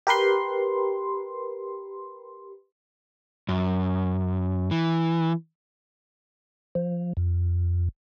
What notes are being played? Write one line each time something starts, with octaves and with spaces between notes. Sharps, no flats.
G4 A#4 B4 C6
F#2
E3
F3
F2